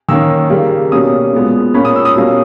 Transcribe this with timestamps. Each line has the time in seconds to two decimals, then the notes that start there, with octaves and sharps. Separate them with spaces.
0.08 D#3 A#3 C#4 E6
0.50 C#3 G3 A#3
0.92 B2 G3 A#3 C#4 D#6
1.33 A#2 G#3 B3
1.74 A#2 A#3 C#4 B5
1.85 D#6
1.96 E6
2.05 D#6
2.16 B2 G3 A#3 C#4